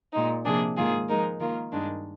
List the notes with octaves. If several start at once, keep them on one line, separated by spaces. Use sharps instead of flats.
A#2 G#3 D#4
C3 F3 A#3 D4 G#4
G#2 D#3 A#3 F4 G#4
F3 G#3 D#4 A#4
D#3 A#3 F4 A#4
G2 D#3 G#3 D4